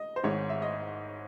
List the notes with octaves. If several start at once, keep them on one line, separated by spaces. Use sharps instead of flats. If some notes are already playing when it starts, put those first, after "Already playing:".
Already playing: D#5
C5
G#1 G#2 D#3 G#3 C#5
E5
D#5